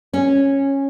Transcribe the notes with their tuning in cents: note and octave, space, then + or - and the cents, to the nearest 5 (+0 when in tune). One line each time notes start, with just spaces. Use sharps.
C#4 -10